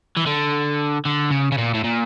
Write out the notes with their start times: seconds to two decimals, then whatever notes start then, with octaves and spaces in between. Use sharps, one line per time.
0.17 E3
0.27 D3
1.05 D3
1.31 C#3
1.52 C#3
1.58 A#2
1.74 A2
1.84 A#2